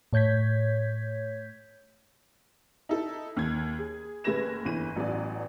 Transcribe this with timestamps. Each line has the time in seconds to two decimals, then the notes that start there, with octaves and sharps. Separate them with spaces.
0.13 A2 C#5 G6 G#6 B6
2.89 D#4 E4 A4
3.37 D#2 G#6
3.78 G#4
4.24 F#1 A3 B4 G#6 A#6 E7
4.65 G1 E3 D#7
4.96 A1 F#3 B3 F#4 D5